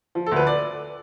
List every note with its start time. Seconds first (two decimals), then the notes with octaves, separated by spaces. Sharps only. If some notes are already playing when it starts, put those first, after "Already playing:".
0.15 F3
0.26 A4
0.31 D2 B4
0.47 D5